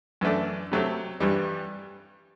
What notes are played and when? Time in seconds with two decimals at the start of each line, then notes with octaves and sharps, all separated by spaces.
0.21 F#2 E3 A3 D4
0.72 C3 F#3 A3 C4
1.20 G2 E3 G3